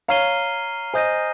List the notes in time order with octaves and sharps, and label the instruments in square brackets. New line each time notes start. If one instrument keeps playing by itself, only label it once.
[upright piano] C#5 F5 [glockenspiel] A#5 F6 C7 D#7 G7
[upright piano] C5 D#5 [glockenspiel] G#5 D#6 G6 A#6 D#7